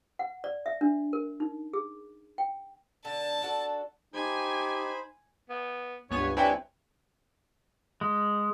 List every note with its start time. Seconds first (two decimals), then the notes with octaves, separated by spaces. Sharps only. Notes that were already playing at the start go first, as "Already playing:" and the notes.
0.19 F#5
0.44 D5
0.66 E5
0.81 D4
1.13 A#4
1.40 D#4
1.73 G#4
2.38 G5
3.05 D3 A5
3.42 D4 F#4 A4
4.14 D#4 G4 C5 G#5 B5
5.50 B3
6.11 C#2 G2 B3 C#5 G#5
6.37 G3 C4 D4 E4 B4 C#5 G5 G#5
8.01 G#3